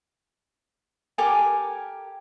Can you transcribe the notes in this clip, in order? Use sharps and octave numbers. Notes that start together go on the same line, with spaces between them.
G4 A4 A#4 G#5